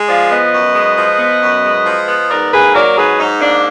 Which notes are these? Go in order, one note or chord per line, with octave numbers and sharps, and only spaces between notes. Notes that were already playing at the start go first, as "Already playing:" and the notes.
Already playing: G#3
F3 D5 F5
B3 B4 D#5
F#2
G#3
F3
B3
F#2
G#3
F3
B3
G#2 A#4 D5
A#3 G#4 B4
F#3 A#4 D5
G#2 G#4 B4
G#2 D#4
A#3 D4